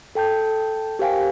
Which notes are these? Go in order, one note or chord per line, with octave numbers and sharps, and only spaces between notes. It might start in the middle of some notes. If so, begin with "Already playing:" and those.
A4 G5 A5 G6
G4 A#4 C5 F5 G5 G#5